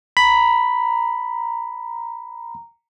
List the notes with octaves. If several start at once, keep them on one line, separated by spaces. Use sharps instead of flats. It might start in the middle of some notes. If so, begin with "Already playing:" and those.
A#5 B5